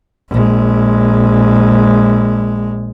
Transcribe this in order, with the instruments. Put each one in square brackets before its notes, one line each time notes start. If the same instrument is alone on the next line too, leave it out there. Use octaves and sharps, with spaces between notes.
[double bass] A#1 G#3